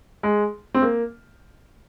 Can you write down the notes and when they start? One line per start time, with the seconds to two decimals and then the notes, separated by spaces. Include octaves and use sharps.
0.23 G#3
0.74 C4
0.82 A#3